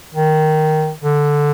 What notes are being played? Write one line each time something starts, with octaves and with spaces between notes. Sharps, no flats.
D#3
D3